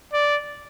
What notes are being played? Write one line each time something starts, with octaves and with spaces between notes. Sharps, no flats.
D5